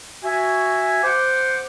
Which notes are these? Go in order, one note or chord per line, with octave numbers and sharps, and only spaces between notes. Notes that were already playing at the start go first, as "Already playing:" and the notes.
F#4 E5 G#5
C5 F#5 D6